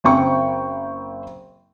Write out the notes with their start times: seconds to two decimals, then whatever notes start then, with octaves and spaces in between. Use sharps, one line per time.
0.04 F#1 C4 G5 C#6